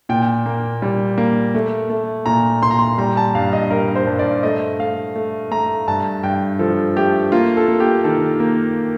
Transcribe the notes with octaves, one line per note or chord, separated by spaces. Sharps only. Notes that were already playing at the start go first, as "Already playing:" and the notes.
A#2 G5
A#3
G3
A#3
A3
A3
A#2 A#5
A#2 C6
A#5
C6
G3 A#5
A5
G2 F5
D#5
G3 A#4
C5
G2
D5
A3 D#5
A3 F5
A3
A3 A#5
G2 A5
G2 G5
F3 A4
A3 G4
A#3 F4
A4
A#3
G4
D#3 A4
A#3